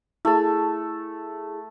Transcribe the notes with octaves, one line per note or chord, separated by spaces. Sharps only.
A3 E4 G#4 A5